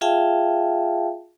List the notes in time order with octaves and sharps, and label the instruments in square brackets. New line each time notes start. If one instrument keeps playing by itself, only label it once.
[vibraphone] F4 G#4 E5 F5 G5 A5